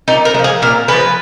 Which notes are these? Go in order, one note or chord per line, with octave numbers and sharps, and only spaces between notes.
A#2 D#4
A#4
G#3
F3
G#4
A#2 A#4
F3 G#3 B4